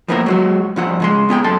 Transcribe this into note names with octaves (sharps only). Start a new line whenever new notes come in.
F3 A#3 B3 E4 G#4 A#4
F#3 G#3 F#4
G2 F3 F#5
C#2 G#3 C6
C#2 B3 G#4 G5
F#2 A4 A5 C6